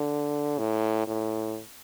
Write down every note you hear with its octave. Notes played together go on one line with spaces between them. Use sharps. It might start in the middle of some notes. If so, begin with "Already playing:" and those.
Already playing: D3
A2
A2